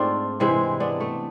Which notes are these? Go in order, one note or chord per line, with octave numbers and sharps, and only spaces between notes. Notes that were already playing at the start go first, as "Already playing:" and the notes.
Already playing: G#2 A3 C4 D4 F4
C3 E3 G#3 C4 E4
B3 D4
A3